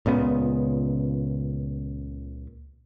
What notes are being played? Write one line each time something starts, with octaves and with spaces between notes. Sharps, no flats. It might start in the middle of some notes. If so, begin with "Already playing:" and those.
C#2 A#2 C#3 B3